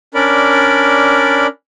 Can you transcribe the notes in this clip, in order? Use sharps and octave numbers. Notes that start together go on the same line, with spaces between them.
C#4 D4 A#4 D5 B5